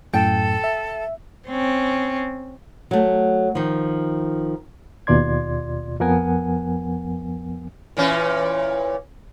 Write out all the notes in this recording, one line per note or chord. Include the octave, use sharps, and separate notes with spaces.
F#2 A2 A4 G5
E5
C4 C#4
F#3 A3
D#3 F3
D#2 B2 F4 D5 C6 G#6
F2 F3 B3 A#4 F#5 G#5
A#2 E3 C#4